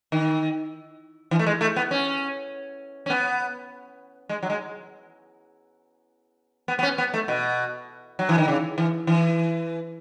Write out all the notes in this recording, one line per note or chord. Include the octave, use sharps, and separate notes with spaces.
D#3
E3
A3
G#3
A3
B3
C#4
C#4
B3
G#3
F#3
G#3
B3
B3
C#4
B3
A3
B2
F#3
E3
D#3
C#3
E3
E3